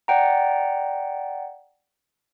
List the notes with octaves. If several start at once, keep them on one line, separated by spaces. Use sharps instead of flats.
D5 F#5 G5 A#5